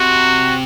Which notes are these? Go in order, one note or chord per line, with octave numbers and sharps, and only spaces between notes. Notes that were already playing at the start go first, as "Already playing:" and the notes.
Already playing: C3 F#4